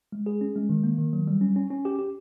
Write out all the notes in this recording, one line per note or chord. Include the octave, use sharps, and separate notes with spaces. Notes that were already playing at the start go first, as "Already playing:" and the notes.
G#3
G#4
C#4
G#3
D#3
A#3
D#3
F#3
G3
C#4
C#4
C#4
G4
G4